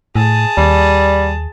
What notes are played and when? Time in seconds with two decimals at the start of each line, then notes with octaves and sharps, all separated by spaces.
0.16 A2 G#4 A5
0.57 D#2 G3